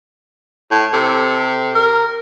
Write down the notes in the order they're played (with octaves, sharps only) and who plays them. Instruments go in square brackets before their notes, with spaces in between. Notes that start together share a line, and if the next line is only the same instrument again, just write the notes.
[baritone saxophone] A2
[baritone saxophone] C3 [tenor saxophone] A4
[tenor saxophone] A#4